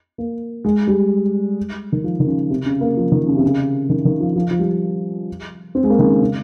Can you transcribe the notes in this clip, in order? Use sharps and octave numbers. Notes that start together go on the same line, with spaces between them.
A#3
G#3
G3
D#3
F3
D#3
C#3
C3
C#3
A#3
F3
D#3
C#3
C3
C#3
D#3
D#3
F3
F3
F3
G3
C4
G#3
A#3
D#3
C#3
C#3